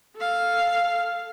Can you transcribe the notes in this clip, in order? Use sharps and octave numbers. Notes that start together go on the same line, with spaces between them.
A4 F5